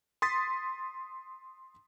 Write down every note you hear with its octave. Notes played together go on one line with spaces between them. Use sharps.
C6 D#6 A6 B6